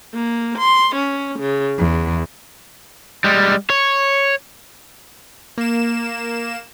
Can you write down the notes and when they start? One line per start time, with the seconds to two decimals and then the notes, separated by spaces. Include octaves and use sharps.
0.13 A#3
0.59 C6
0.95 C#4
1.40 C#3
1.78 E2
3.24 G3 G#3
3.70 C#5
5.58 A#3 E7